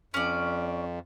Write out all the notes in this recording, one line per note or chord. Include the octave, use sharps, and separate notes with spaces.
F2 C#4 D5